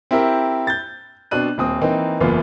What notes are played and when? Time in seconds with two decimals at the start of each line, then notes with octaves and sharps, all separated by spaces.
0.11 C4 E4 G4 A#4
0.67 G6 A6
1.31 B2 C4 D4 F#6 D#7
1.58 D#1 C4 D#6
1.82 E3 A#3 C4 D#4
2.20 F#1 E2 B3 F4